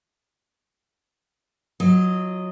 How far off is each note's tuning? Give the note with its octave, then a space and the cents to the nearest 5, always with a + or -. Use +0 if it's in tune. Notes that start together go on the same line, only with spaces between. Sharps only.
F#3 -10 F4 -35 D#5 +0